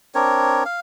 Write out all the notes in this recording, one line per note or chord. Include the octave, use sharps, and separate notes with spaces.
C4 D4 A#4 C#5
F5